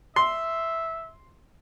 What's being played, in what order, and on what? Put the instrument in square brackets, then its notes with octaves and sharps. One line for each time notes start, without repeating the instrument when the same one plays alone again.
[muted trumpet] E5 [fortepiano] C6